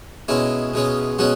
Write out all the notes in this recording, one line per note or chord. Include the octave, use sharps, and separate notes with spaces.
B2 G#3 C#4 E4
B2 G#3 C#4
B2 G#3 C#4 F#4